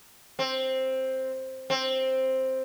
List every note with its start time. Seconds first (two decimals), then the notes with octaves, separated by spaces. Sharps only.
0.39 C4
1.70 C4